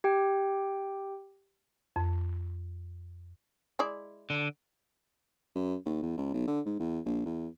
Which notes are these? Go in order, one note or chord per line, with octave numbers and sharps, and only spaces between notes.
G4 G5
F2
G#3 E4 D5
D3
F#2
D#2
E2
C#2
B1
D3
G#2
E2
A#1
E2